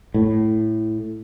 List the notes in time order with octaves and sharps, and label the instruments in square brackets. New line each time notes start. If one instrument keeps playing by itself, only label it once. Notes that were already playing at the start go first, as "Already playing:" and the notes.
[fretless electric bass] A2